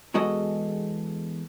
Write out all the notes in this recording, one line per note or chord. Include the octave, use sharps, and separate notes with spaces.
E2 G#3 F#4 A4 D#5